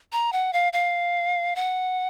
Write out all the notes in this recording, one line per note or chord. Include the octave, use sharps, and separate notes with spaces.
A#5
F#5
F5
F5
F#5